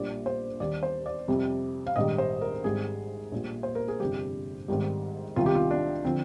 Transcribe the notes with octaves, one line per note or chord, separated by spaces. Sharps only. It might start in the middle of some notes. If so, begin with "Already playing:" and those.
Already playing: A#1 A#2 G3 D5
C5
D#2 D#3 G3 D5
C5
D5
F2 C3 G3
F5
A#1 G#2 D#3 G3 D#5
C5
A#4
G#1 G#2 G3 G#4
A#1 A#2 G3
C5
A#4
G#4
G1 F2 C3 G3 G4
G#1 G#2 D#3 G3
C2 C3 D#3 G3 F4
G4
F4
D4
D3 F3 C4